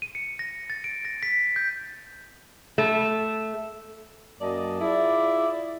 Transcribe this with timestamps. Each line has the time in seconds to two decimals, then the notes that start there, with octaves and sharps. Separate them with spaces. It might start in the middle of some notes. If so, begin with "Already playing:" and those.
0.02 D#7
0.15 C#7
0.39 A#6
0.70 A6
0.84 D7
1.05 A#6
1.23 B6
1.56 G6
2.78 A3
4.40 F#2 A#3 D5 D#5 A5
4.81 E4 F4 G#4 D5